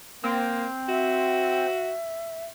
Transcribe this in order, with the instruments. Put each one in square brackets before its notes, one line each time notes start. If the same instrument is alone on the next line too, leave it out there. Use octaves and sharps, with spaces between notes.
[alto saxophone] A#3 [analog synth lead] C4
[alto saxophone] F#4 [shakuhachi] E5